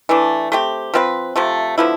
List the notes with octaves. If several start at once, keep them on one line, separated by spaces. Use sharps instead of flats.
E3 A3 D4
A3 C4 G4
F3 C4 F4 B4
C3 F3 A3
D3 F3 B3 E4